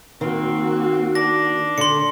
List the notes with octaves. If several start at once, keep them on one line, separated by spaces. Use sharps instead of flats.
D#3 A#3 C4 F#4
D4 A#6
D3 C6 C#7